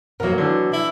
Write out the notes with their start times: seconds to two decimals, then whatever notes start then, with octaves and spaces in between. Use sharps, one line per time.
0.20 B2 F#3 A#3 A#4
0.38 D3 E3
0.73 E4